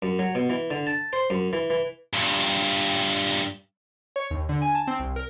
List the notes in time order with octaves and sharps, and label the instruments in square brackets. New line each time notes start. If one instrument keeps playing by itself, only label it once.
[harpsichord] F#2
F#3
B2
E3
D3
A5
C5
F#2
E3
E3
[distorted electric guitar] G2 A#2
[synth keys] C#5
D#2
D3
G#5
A5
C4
C2
A#4